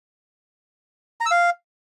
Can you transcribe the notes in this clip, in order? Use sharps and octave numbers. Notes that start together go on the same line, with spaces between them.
A#5
E6
F5